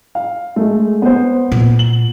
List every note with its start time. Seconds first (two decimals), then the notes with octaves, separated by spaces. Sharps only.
0.15 F5
0.56 G#3 A3
1.02 B3 C5
1.52 A#2
1.79 F#7